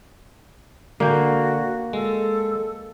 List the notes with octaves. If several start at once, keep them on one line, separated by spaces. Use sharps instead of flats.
D3 A#3 F#4 G5
G#3 A4